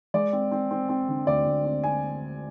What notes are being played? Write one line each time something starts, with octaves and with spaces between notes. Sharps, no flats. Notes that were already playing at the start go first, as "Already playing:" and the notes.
G#3 D5
C4
C4
C4
C4
D3
D2 D5
D2
C4
C4 G#5